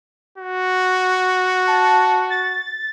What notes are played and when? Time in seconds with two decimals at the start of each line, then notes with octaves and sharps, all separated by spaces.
0.38 F#4
1.67 A5
2.30 A6